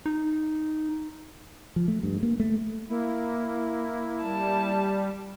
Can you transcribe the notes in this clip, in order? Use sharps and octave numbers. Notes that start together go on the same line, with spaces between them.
D#4
F3
A3
G2
A#3
A3
A#3 E4
G3 A5